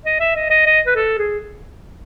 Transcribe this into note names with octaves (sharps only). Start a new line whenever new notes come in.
D#5
E5
D#5
D#5
D#5
B4
A4
G#4